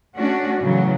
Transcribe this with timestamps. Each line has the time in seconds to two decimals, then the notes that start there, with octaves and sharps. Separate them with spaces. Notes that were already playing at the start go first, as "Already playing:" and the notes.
0.17 A3 C#4 D4 F#4
0.62 A2 C#3 E3 F#3